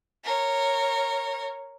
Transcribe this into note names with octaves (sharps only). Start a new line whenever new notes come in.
A#4 C#5